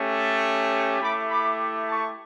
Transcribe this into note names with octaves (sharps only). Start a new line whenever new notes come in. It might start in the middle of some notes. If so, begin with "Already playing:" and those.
Already playing: A3 C#4 G4
A3 E4 G4 B5 D6
B5 D6
A5 C#6